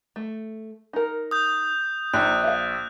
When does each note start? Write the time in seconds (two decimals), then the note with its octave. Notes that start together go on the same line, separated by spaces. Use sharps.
0.16 A3
0.93 D#4 A#4
1.31 D#6 G6
2.14 A#1 D#4 F#6
2.44 E5 F5